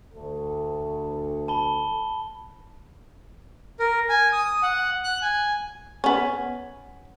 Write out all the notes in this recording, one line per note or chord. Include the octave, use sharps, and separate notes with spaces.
D2 A4
A5 B5 G7
A#4
G#5
D#6
F#5
F#6
G#5
B3 C#4